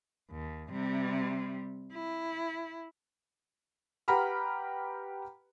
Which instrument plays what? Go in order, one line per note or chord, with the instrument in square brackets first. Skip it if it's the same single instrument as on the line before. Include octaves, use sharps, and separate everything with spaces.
[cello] D#2
C3 G3
E4
[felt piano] G4 B4 F#5 A#5 B5 F6